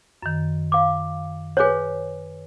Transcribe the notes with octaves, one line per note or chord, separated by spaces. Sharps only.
F#2 D#3
F5 D6
G#4 B4 C#5 G#5 F#6